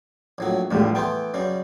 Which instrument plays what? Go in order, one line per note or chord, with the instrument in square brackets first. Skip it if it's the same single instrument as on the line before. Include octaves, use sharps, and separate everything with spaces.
[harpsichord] A#1 A2 F#3
[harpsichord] E2 D3 [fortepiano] A2 F3 G3
[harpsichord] E3 A3 B3 [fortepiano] G5 C6
[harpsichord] F#2 C#3 G3